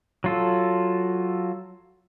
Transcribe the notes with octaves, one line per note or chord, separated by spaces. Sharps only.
F#3 F4 A4